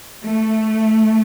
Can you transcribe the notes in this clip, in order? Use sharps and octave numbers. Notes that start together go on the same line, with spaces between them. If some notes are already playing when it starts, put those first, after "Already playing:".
A3